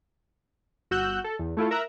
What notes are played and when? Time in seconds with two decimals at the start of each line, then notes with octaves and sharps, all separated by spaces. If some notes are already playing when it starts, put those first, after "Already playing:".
0.91 G1 F#4 E6 F#6 G6
1.24 A4
1.39 E2
1.57 A3 E4 F4 A4
1.71 A#4 E5 A#5 E6 F#6